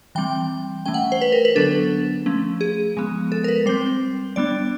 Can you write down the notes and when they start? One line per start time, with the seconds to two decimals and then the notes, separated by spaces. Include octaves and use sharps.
0.15 E3 G3 C4 G5
0.86 E3 A3 C#4 G5
0.94 F#5
1.12 C5
1.21 B4
1.32 A#4
1.45 B4
1.55 D3 F#3 B3 D4 A4
2.26 F3 A3 C#4
2.61 G#4
2.97 F3 G#3 B3
3.32 A4
3.44 A#4
3.48 B4
3.66 G3 C4 C5
4.36 G3 B3 D4 D5